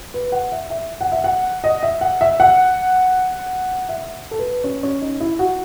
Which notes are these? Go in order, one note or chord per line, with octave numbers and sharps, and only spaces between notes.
B4
F#5
E5
E5
F#5
E5
F#5
D#5
E5
F#5
E5
F#5
E5
A4
B4
C#4
C#4
D#4
E4
F#4